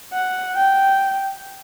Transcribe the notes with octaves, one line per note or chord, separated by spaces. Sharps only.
F#5
G5